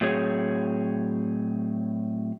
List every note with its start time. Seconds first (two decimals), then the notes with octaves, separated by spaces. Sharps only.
0.01 A2 F#3 C4 G#4 C#5